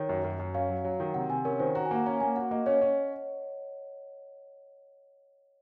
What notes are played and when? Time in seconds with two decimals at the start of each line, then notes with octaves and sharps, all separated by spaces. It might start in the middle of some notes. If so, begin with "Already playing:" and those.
Already playing: D#3 C#5
0.09 F#2
0.24 F#2
0.40 F#2
0.54 C#4 F5
0.69 F#3
0.84 F#3
1.00 D#3
1.14 C3 F#5
1.29 C3 G#5
1.45 C#4 A#4
1.60 D#3 C5
1.75 F#4 A#5
1.85 G#5
1.91 A#3 F#5
2.06 C#4 A#5
2.20 A#3 G#5
2.36 F#4 F#5
2.51 A#3 D#5
2.66 C#4 C#5
2.81 C#4